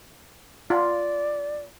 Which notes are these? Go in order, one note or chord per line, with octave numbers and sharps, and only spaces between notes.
F4 D5